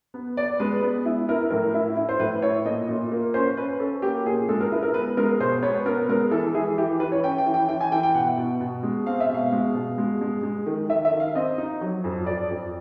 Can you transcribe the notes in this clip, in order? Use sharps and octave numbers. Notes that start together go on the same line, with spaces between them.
B3
B3 D5
G#3 B4
B3
E4
E4 A#4
A2 A#4
E4
E4
C5
A2 B4
E4 C#5
A#2 D#5
A#2
A#3
C#4 C5
C#4 B4
C#4 A4
A#3 G4
A#2 G#4
G#3 A4
A#4
E4 B4
A#4
B3 B4
G#3 A#4
B2 C5
B3 C#5
B3 A#4
G#3 A#4
E3 A4
E3 G#4
E3 G4
E3 B4
C#5
C#4 G5
G5
E3
G5
E3 G5
G#5
E3 G5
G5
B2 F#5
B2
B2
G#3
C4 F5
E5
B2
F5
G#3
B2
G#3
G#3
G#3
D#3
D#3 E5
E5
D#3
F5
C4 D#5
D#4
F#3
F2
F2 D5
F2